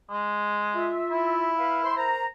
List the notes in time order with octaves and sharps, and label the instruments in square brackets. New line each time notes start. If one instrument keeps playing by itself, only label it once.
[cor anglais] G#3
[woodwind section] F4 E5
[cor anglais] E4
[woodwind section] B4 F5
C5 E5 C6
A#4 C5 A#5